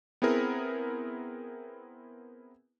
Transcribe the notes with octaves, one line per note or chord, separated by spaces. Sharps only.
B3 C4 E4 G#4 A#4